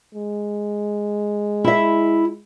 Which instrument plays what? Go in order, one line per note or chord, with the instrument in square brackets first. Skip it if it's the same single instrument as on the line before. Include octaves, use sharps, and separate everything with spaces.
[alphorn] G#3
[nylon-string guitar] E4 E5